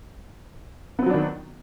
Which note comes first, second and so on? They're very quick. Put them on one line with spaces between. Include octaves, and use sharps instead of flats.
B3 C4 F#3 D4 D#3